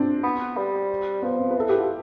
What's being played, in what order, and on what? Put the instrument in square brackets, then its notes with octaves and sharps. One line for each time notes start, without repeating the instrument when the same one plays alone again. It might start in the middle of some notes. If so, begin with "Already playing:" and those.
Already playing: [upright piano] C4 D4
[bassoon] B3
G3
[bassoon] F3 [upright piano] B3
[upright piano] C4
B4
[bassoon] E3 [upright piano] A4
[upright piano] G4
F4